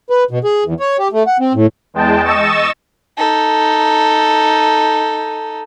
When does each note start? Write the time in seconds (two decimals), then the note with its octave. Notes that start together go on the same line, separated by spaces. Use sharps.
0.10 B4
0.31 B2
0.44 G#4
0.65 E2
0.80 C#5
0.99 G4
1.12 A3
1.27 F#5
1.39 C4
1.54 A2
1.94 E2 G#3 G5 A5
2.25 D#5 C#6 E6 A6 E7
3.18 D#4 A4